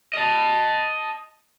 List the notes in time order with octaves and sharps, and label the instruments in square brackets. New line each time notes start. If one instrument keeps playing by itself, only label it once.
[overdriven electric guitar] D#5 A5